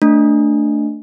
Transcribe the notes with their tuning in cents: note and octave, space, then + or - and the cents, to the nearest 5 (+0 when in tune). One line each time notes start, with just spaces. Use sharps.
A3 +15 D4 +0